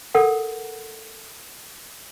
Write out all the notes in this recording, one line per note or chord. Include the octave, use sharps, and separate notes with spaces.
A4 A#4 F#5